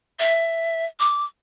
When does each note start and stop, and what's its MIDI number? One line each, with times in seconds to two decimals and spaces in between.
0.19 0.86 76
1.00 1.25 86